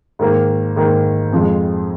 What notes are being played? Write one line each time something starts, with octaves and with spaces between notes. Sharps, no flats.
G#2 D#3 A#3
G#2 D#3 A#3
F2 F3 G#3